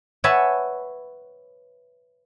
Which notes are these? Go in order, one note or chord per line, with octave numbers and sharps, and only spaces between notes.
B4 C#5 E5 F#5 G#5 A5